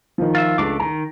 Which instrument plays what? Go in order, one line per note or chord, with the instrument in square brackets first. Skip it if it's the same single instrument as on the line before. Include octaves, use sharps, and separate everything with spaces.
[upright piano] D#3 F3
[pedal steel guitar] F4 E5
[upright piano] C#2 [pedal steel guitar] A3 D4 D6
[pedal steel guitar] D#3 [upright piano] A#5